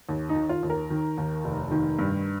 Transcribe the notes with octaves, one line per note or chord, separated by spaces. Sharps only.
D#2
D#4
D#3
F4
D#2
A#4
D#3
D#2
F1
D#3
G2